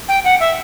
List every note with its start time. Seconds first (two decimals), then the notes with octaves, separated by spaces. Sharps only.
0.08 G5
0.24 F#5
0.40 E5